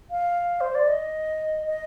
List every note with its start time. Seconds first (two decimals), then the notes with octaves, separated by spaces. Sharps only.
0.11 F5
0.60 C5
0.75 D5
0.88 D#5
1.66 D#5